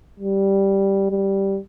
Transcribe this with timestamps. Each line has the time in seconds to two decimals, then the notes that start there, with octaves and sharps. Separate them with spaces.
0.19 G3
1.11 G3